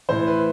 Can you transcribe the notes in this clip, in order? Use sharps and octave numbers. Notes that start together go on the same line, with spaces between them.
A2 E3 C5
B4